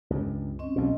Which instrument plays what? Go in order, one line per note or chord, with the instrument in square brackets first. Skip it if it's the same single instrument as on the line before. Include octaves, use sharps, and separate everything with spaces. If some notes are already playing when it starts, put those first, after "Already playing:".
[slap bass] C#2 G2
[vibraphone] C4 C#4 D#5
[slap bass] B1 A#2